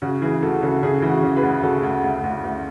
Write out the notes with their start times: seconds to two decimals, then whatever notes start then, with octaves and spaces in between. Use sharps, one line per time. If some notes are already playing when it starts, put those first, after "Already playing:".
0.02 C#3 F#4
0.22 E3 G#4
0.42 D2 F#4 A4
0.62 C#3 F#4 A4
0.83 C#3 G#4
1.02 E3
1.09 F#4
1.23 C#3
1.36 G#4 B4
1.43 D2
1.63 C#3 F#4 A4
1.83 D2
2.04 D2
2.23 D2
2.44 D2